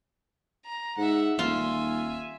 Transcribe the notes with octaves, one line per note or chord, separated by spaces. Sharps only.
A#5
G#2 E5 F#5
D#1 F4 E5 G#5